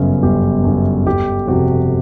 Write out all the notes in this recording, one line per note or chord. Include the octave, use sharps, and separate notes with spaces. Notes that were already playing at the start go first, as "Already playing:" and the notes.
Already playing: G1 F#2 C#3 B3 C#4
G1 G4
F#2 C#3
G1 G4
F2 C3 F#4